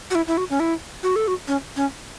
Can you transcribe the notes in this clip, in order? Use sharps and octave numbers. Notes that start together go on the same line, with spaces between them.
F#4
E4
E4
F#4
C#4
E4
F#4
A4
F#4
C#4
C#4